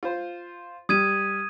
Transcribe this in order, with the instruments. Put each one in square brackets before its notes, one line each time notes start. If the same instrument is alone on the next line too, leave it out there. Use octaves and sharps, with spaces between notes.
[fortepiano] F4 C5
[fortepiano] G3 [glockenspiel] D#6 G#6 D#7